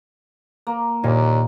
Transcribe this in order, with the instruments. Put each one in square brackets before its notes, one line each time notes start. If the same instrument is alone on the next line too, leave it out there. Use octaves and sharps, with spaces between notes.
[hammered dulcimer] A#3
[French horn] D#2 [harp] A#2